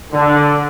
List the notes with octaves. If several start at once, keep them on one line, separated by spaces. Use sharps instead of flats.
D3